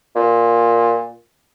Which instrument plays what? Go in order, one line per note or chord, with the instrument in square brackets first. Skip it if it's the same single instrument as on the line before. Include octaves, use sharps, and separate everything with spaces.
[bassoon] A#2